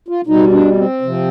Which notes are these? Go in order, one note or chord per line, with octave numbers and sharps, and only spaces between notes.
F4
B2 G3 D#4
D4
C4
C3 F3